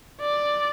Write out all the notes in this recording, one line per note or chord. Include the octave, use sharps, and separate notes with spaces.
D5